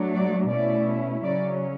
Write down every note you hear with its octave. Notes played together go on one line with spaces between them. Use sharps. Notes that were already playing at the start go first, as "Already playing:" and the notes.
Already playing: F#3 A3 D4
D5
B2 A3 C#4 E4 D5
C#3 F#3 C#4 D5